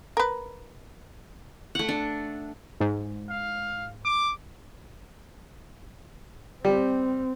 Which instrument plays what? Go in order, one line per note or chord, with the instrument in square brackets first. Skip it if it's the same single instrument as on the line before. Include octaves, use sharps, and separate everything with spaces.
[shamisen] A#4 B4
[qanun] A3 F#5
D4
[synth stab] G#2
[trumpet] F5
D6
[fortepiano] G3 [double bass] C4